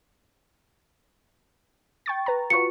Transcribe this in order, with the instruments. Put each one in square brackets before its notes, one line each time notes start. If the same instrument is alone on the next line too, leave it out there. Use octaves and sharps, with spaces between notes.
[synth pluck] G5 C#6 A6
B4 A#5
[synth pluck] F4 F#4 B4 [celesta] C#6 C#7